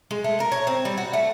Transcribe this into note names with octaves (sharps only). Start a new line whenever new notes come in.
G#3
A3
A#4
C#5
C4
G3
F#4
A3